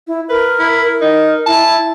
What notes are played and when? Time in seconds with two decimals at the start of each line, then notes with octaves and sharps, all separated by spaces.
0.07 E4
0.29 A#4 B4
0.59 E4
0.84 A#4
1.01 D#4
1.46 E4 A5